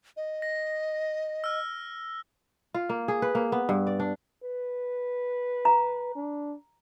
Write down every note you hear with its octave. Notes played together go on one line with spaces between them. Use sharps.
D#5
A#6
E6 F6
F4
A#3
G#4
B4
A#3
B3
G2
D5
D4
B4
A#5
D4